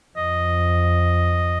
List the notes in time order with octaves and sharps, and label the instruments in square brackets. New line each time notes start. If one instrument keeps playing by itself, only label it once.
[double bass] F2 [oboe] D#5